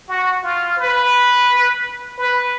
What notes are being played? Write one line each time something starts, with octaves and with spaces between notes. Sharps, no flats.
F#4
F4
B4
B4